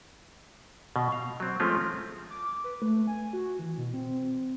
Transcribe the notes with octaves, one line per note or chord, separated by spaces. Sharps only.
B2
F5
F#3 C4
F3 G#3 A3 C4 C#4 F4
D6
B4
A3
G#5
F#4
E3
B2
C4